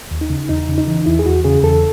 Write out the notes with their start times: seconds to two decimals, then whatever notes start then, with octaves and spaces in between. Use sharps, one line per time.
0.11 D#2
0.21 D#4
0.30 C#3
0.49 E2 D#4
0.69 C#3
0.78 D#4
0.88 E3
1.06 E2 E4
1.19 G#4
1.26 E2 F#4
1.44 C#3 G#4
1.64 E2 A4